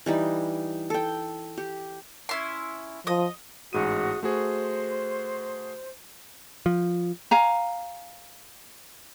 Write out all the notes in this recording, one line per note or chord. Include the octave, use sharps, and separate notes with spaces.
E3 G3 D#4
A4 G5
G4
C#4 E4 C6
F3 D#5 D#6
A1 G#2 F#4 G#4 D#6 D#7
A3 F#4 G#4 C5 C6
F3
F5 G#5 A#5